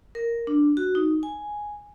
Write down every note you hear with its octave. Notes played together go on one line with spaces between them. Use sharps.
A#4
D4
F#4
D#4
G#5